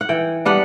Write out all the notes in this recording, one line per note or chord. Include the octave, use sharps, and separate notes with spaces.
F#5
E3 G5
G3 B3 D4 F#5